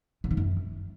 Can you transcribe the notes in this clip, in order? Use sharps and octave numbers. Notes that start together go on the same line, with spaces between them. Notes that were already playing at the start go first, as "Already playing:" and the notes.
C3
D#3
F#2